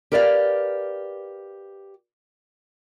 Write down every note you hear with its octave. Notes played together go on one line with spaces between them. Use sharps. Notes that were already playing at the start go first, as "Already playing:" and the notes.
G4 A#4 B4 D5 E5 F5